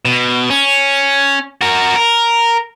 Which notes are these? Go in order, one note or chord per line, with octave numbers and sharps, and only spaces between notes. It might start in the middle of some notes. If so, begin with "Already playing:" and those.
B2
C#4
F#4 A#4
A#4